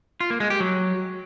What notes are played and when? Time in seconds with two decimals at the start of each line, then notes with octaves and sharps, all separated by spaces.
0.20 F4
0.30 A#3
0.40 G#3
0.50 G4
0.60 F#3